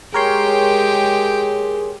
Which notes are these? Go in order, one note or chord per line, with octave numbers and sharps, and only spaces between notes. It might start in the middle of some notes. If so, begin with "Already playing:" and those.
G#3 G4 G#4 A#4 C#5 G5 C6